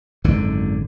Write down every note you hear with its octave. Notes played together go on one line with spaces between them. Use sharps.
G#1 F#2 D3